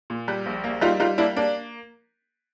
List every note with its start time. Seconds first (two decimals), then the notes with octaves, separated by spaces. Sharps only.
0.10 A#2
0.28 G3
0.46 A#1
0.64 A#3
0.81 G3 D#4 F4
1.00 G3 D#4 F4
1.18 A#3 D4 E4
1.36 A#3 D4